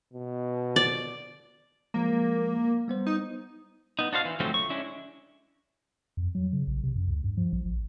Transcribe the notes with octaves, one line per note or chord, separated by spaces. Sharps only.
B2
D5
F3 G#3 A#3
G3 B3 C5
D#4
B3 D#4
D4 F#4 C5 F5
E3
D3 F3 F#3 A3 C4
C#6
G#3 C#4 D4 E4
F2
F#3
C#3
A#1
C3
F#2
D2
G2
F3
A#1
A1